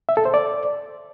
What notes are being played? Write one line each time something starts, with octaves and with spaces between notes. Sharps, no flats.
E5
A4
C5
D5